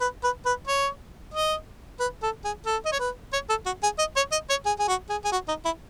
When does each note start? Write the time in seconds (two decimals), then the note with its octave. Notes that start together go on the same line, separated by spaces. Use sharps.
0.01 B4
0.24 B4
0.46 B4
0.67 C#5
1.34 D#5
2.00 B4
2.23 A4
2.44 G#4
2.66 A4
2.85 D#5
2.92 C#5
2.99 B4
3.33 C#5
3.49 A4
3.66 F#4
3.83 G#4
3.99 D#5
4.16 C#5
4.32 D#5
4.50 C#5
4.66 G#4
4.79 G#4
4.88 F#4
5.10 G#4
5.25 G#4
5.32 F#4
5.48 D#4
5.65 E4